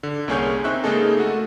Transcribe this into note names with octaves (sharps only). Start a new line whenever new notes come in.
D3
C2 A#3 C#4 G#4 C#5 G6
C4 D#4 E5 C#6 F#6
C#3 G#3 A#3 D#4 G#4 A4
A3 F#4